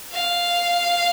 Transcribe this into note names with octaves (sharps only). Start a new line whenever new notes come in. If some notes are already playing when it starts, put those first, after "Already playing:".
F5